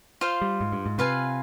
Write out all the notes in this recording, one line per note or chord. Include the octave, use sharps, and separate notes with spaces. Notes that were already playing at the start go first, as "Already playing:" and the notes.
F4 C5 F5
G3
G#2
G2
G#2
C3 F4 B4 F5 G#5